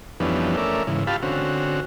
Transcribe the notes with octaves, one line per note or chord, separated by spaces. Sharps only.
F2 E3 G3 B3 C#4 D4
A3 C#4 A#4 D5 E5
G#2 C#3 E3
F4 G4 F5 A5 B5
D3 C4 C#4 F#4